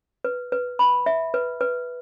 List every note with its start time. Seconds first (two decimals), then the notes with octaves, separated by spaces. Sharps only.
0.24 B4
0.52 B4
0.79 B5
1.06 E5
1.34 B4
1.61 B4